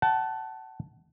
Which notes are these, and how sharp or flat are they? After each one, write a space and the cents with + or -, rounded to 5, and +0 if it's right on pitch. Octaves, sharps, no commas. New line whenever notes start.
F#5 +35 A5 +0